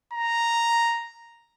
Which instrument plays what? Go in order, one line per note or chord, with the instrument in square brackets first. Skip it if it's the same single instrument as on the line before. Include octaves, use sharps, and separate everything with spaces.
[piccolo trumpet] A#5